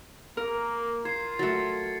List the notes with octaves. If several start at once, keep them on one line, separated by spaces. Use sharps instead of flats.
A#3 A#4
F4 C5 G#6 C7
F#3 A3 A6 C#7